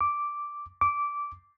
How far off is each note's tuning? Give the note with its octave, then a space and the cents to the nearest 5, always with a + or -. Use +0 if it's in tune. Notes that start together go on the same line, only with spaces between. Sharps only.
D6 -5
D6 -15